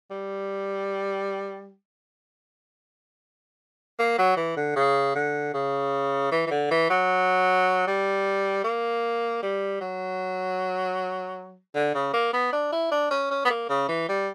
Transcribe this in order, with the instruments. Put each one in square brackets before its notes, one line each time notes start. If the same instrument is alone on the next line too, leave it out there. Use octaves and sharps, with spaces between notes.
[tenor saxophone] G3
A#3
F#3
E3
D3
C#3
D3
C#3
E3
E3
D3
E3
F#3
G3
A#3
G3
F#3
D3
C#3
A#3
B3
D4
E4
D4
C#4
C#4
B3
A#3
C#3
E3
G3